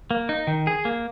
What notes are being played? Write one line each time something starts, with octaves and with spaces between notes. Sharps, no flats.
A#3
D#4
D#3
G#4
A#3